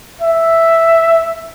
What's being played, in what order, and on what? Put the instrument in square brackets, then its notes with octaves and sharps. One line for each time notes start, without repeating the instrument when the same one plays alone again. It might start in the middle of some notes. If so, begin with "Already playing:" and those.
[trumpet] E5